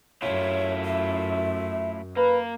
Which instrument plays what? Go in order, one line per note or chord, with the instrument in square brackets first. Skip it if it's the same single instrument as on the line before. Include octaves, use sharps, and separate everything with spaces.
[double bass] F#2 [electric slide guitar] A3 E4 F4 [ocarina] C#5
[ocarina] E5
[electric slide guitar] A#3 [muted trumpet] B4